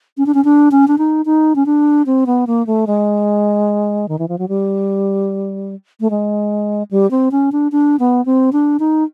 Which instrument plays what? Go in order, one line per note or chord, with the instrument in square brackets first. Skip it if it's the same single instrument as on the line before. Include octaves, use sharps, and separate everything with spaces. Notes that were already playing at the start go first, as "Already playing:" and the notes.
[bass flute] C#4
D4
C#4
D4
C#4
D4
D#4
D#4
C#4
D4
C4
B3
A#3
A3
G#3
D#3
E3
F3
F#3
G3
A3
G#3
G3
C4
C#4
D4
D4
B3
C4
D4
D#4